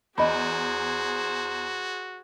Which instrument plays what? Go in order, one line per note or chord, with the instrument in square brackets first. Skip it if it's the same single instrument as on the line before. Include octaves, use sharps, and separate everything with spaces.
[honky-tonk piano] E2 [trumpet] F#4 [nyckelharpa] G#4 C5 [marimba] D#5 B5